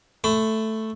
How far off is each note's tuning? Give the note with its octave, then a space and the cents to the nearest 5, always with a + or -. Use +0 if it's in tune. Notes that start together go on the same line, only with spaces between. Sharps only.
A3 +0 B5 +30